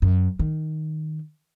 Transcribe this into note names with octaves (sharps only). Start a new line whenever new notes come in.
F#2
D#3